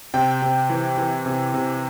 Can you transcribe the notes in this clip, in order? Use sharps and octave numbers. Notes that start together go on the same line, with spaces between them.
C3 G5
C3
E3
E3
C3
C3